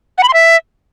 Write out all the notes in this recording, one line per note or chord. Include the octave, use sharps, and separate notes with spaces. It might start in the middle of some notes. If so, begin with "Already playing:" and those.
F#5
B5
C6
E5